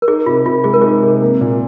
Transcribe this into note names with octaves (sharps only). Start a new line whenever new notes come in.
A#4
D#4 G#4
C3 F4
C3 F4
G#3 G#4
A#4
D#4 G#4
C3
A#3
A#2